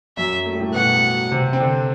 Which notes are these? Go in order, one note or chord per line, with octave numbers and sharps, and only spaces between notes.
F#2 F#3 E5
A3
G3
A2 A3
B2 B3 F#5
C3 C4
C4
D3 D4